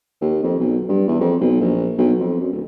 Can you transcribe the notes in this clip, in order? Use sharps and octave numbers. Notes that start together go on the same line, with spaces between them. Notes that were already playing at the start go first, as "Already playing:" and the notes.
D#2
F2
B1
G2
E2
F2
B1
A#1
B1
F2
F#2
D1